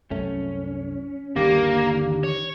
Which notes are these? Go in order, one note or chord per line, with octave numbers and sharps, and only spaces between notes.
C2 F#2 A3 C#4
G1 D#2 D3 D#3 G3 A#3 G4
C#5